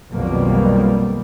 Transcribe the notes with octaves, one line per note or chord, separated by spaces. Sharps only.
B1 F2 B2 D#3 G3 A#3